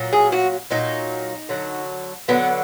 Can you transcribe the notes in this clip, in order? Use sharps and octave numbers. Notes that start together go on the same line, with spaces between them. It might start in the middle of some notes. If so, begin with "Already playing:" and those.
Already playing: A#2 F#3
G#4
F#4
A#2 F#3 D#4
D3 F#3
D3 F#3 B3